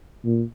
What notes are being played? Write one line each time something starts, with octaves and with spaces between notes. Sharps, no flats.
A#2